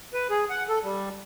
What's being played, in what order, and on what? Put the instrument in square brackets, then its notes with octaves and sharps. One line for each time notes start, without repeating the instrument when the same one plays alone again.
[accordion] B4
G#4
F#5
A4
G3